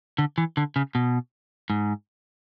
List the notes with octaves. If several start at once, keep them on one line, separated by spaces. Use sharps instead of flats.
D3
E3
D3
C#3
B2
G#2